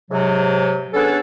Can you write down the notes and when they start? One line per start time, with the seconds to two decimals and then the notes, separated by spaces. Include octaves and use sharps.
0.11 G#2 C3 F#3
0.93 B3 C#4 D4 G#4 A4